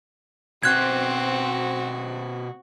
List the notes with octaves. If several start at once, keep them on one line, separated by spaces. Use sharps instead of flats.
B2 C4 F#4 C5 F#6 G#6